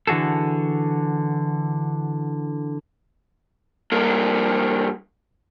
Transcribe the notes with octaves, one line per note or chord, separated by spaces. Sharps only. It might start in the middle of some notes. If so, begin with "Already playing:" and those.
D3 E3 F#4 G#4 A4
G2 A#3